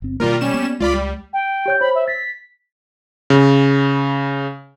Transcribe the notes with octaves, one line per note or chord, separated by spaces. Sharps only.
G1 C4
B2 D#3 G3 A#3 F4 A#4
G3 C#4 E7
A#3 B3
C#2 G#3 F4 D5 B5
G3
G5
G4 C#5 G6
C5 C#5 B5
E5
A6 B6
C#3